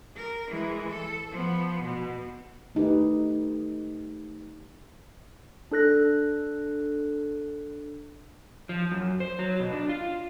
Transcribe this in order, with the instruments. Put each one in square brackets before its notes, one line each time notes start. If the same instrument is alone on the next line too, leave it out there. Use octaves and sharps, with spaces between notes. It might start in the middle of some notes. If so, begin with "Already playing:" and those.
[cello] A#4
E3 G#3
A4
F3 B3
B2
[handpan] A3 D#4 G4 B4
[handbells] D4 A4 F#6 A#6
[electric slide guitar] F3
F#2
C5
F#3
B2
D4
F4